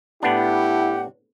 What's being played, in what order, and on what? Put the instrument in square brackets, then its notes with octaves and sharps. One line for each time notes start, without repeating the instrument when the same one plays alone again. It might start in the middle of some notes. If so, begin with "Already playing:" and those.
[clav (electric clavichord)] A2 B3 D4 [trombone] E4 [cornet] G4 [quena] F#5